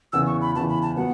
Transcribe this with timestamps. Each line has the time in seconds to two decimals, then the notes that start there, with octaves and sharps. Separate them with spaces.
0.13 E2 C#3 E3 E6
0.27 C#6
0.41 B5
0.55 E2 C#3 E3 A5
0.69 B5
0.82 A5
0.96 F#3 B3 F#5